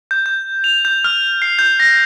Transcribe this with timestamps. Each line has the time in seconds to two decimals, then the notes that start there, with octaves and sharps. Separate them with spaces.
0.11 G6
0.26 G6
0.64 F7
0.85 G6
1.04 F6
1.42 C7
1.59 G6
1.80 A#6